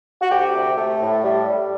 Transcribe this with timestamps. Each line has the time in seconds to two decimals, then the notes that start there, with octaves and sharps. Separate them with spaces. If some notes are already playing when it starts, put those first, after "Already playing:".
0.22 F#4
0.31 D2 G4
0.54 C3
0.77 A3
1.01 A2
1.24 G3
1.48 G3